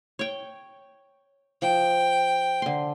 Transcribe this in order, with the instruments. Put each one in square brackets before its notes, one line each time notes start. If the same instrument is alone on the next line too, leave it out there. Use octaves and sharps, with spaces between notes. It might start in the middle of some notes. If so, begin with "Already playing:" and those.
[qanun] C#5 G5
[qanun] F3 [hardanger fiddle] G5
[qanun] D3 C6